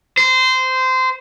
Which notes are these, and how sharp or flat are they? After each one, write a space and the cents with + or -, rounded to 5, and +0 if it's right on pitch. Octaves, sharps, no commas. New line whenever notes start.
C5 -20